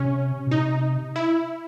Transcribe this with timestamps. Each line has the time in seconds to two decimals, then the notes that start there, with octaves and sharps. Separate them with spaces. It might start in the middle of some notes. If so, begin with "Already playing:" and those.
Already playing: C3 C#4
0.47 B2
0.51 C3 D#4
1.16 E4